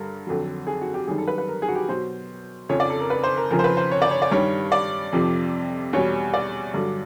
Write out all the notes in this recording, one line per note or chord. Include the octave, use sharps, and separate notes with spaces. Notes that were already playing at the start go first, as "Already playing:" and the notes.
Already playing: G2 D3 G3 A#4
F2 D3 F#3
G#4
F#4
G4
F#2 D#3 G3 G#4
A4
B4
B4
A#4
G#4
F#4
G4
B2 F#3 C5
F2 C#3 F3 C#5
D5
A4
A#4
B4
C5
A#4
F2 C#3 F3 A#4
C5
B4
C5
C#5
D5
C#5
D5
G2 D#3 G3 C#5
D5
F2 C3 F3
E2 B2 G3 C#5
D5
G2 D3 F#3